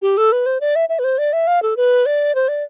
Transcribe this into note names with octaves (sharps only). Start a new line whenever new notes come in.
G4
A4
B4
C5
D5
E5
E5
B4
C5
D5
E5
F5
A4
B4
D5
C5
D5